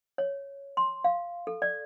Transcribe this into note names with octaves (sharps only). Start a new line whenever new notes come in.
C#5
C6
F5
A4
D5